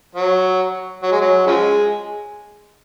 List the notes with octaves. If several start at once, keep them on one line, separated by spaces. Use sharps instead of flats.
F#3
F#3
G#3
F#3
C#3 F3 G#3